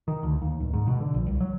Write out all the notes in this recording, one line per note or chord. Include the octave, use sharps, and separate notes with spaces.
D#3
D2
D#2
D1
G#2
B2
D3
A#1
C2
F#3